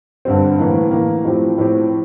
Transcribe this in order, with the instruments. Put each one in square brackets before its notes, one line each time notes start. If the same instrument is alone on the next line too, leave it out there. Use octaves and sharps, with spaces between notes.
[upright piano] G2 D3 G3 C4
A2 E3 A#3
A2 E3 A#3
A2 F3 C4 G4
A2 F3 C4 G4